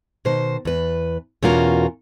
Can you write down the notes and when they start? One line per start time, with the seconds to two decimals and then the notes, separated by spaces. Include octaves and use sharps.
0.25 B2 D#3 C5
0.65 E2 B4
1.43 E2 B2 C#4 F4 F#4 A#4